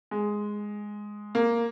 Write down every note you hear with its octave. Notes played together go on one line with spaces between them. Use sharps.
G#3
A#3